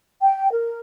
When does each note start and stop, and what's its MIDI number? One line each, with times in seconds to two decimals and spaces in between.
0.21 0.52 79
0.52 0.79 70